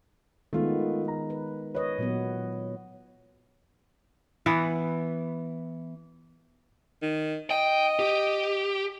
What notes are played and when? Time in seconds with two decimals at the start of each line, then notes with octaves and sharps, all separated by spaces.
0.53 D#3 G#3 A3 B3 F4
1.08 A#5
1.30 B4
1.75 B4 C#5 D#5
1.98 A#2 F#3 B3
4.46 E3 B3 F#5
7.02 D#3
7.51 D#5 G5
7.99 G4